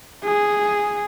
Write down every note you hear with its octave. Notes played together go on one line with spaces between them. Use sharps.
G#4